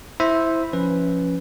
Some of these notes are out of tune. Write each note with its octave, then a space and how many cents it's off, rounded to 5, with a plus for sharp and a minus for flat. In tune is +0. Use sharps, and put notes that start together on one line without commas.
E4 -5 C5 +0 E5 -5
F3 +0 C#4 +0 B4 +0